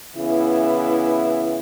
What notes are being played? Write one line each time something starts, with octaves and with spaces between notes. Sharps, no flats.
C#3 E3 B3 E4